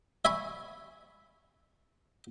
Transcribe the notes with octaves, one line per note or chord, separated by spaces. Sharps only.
E5 G#5 B5 C#6